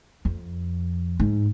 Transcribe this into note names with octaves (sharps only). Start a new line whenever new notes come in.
F2
G#2